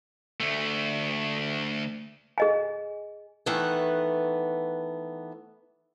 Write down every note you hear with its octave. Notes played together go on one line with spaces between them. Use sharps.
D2 A3
G#4 D#5 G#5
D#3 E3 A3 B3 F#5